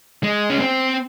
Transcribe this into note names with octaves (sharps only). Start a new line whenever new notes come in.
G#3
C#4
C4